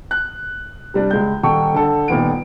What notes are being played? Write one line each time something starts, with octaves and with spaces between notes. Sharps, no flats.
F#6
C3 G3 D4
C#2 G#3 G6
D#1 A4 G5 C#6
D3 A4
D#1 A#2 D#3 B3 D7